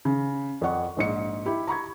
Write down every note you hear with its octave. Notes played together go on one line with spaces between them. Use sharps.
C#3
F2 D5 F#5 C#6
A#1 G#2 C#7
E4 G4
A#5 B5 C#6 G#6